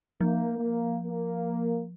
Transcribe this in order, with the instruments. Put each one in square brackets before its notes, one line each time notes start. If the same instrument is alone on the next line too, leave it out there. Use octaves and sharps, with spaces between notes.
[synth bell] F3 [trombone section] A#3
[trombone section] A#3
A#3